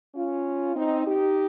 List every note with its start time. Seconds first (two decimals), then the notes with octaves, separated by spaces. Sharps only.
0.15 C#4 F4
0.76 C4 D#4
1.07 D#4 G4